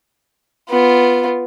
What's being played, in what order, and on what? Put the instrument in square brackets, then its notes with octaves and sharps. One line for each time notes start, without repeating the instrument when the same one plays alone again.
[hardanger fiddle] B3 F4